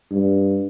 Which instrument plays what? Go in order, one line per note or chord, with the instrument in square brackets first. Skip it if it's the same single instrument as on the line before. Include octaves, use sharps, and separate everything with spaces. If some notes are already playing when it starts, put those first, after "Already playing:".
[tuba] G2